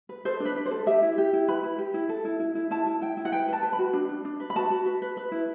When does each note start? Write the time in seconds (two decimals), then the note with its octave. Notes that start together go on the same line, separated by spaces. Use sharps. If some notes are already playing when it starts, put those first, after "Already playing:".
0.09 B4
0.25 A4 C5
0.40 D4
0.45 B4
0.56 D4
0.66 C5
0.71 A4
0.86 G4 E5
1.02 E4
1.18 G4
1.33 E4
1.48 B4 B5
1.63 E4
1.78 G4
1.94 E4
2.09 A4
2.25 E4
2.40 E4
2.55 E4
2.71 E4 A5
2.86 E4
3.01 E4 G5
3.17 E4
3.25 F#5
3.32 B4 G5
3.48 B4 A5
3.63 B4
3.73 B5
3.79 F#4
3.93 D4
4.09 D4
4.25 D4
4.40 B4
4.50 B5
4.55 F#4 A5
4.70 F#4
4.86 B4
5.02 B4
5.17 B4
5.32 E4